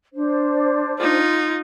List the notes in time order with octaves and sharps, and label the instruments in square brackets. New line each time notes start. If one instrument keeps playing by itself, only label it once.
[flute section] D4 C5
[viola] D#4 F4